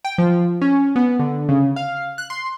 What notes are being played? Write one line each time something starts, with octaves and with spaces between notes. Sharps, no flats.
G5
F3
C#4
B3
D3
C#3
F5
F#6
C6